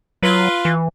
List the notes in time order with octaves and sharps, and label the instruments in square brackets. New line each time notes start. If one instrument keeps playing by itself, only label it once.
[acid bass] F#3 [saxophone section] F4 B4
[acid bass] E3